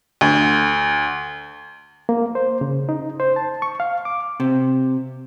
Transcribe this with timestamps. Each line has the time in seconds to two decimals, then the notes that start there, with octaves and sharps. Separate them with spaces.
0.21 D2
2.09 A#3
2.35 C5
2.61 C#3
2.89 D#4
3.20 C5
3.36 A5
3.62 C#6
3.80 F5
4.05 D6
4.40 C3